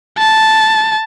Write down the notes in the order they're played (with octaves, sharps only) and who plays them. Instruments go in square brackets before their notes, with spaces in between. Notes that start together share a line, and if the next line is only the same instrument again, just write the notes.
[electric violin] A5